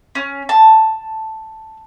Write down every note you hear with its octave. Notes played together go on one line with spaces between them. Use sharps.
C#4
A5